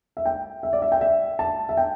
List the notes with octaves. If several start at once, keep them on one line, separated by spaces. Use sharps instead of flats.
E5
G5
E5
D5
E5
G5
E5
A5
E5
G5